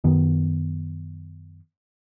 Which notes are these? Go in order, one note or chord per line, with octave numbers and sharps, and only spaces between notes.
F#2 D#3 B3